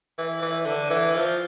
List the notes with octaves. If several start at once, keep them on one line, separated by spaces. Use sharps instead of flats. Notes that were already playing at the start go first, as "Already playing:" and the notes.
E3
E3
D3
E3
F3